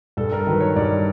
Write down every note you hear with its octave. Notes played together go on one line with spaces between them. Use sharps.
G2 A4
A#4
D#3 F#3 B4
C#5
G2 D5